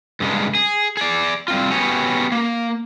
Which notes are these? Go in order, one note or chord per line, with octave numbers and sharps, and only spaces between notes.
G2 C#3 G#3
G#4
G#4 D5
G3 C4 F4
B3 C#4 F#4 G4 C#5 G#5
A#3